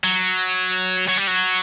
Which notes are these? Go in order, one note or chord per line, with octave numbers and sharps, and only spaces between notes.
F#3
F#3
G3
F#3